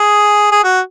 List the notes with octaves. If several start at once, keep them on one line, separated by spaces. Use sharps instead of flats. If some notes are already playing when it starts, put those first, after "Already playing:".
Already playing: G#4
G#4
F#4